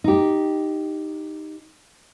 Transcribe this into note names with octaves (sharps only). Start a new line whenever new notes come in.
D#4 G4